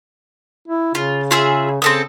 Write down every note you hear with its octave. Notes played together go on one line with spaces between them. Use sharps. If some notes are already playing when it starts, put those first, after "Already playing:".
E4
C#3 F4
F4 G#4 E5
C#3 C4 A4 D#6